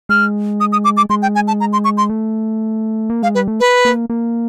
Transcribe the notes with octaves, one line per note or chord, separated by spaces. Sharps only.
G#3 F6
D#6
D#6
D6
D6
G#3 C6
G5
G#5
A5
A#5
C6
C#6
C6
A3
A#3
G#3 F5
G3 B4
A3
B4
A#3
A#3